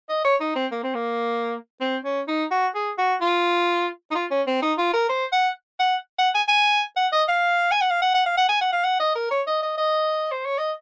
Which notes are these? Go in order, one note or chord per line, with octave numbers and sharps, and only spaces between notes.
D#5
C#5
D#4
C4
A#3
C4
A#3
C4
C#4
D#4
F#4
G#4
F#4
F4
D#4
F4
C#4
C4
D#4
F4
A#4
C5
F#5
F#5
F#5
G#5
G#5
F#5
D#5
F5
G#5
F#5
F5
F#5
F#5
F5
F#5
G#5
F#5
F5
F#5
D#5
A#4
C#5
D#5
D#5
D#5
C5
C#5
D#5